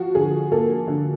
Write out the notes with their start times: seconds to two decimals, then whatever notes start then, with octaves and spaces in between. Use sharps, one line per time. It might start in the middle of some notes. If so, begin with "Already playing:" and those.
Already playing: F3 F#4
0.15 D3 G#4
0.52 A#3 A4
0.87 D3